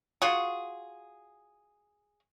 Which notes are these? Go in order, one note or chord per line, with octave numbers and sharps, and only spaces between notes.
F4 F#4 G#4